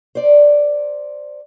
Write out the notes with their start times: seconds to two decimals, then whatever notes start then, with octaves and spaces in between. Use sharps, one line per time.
0.15 C5 D5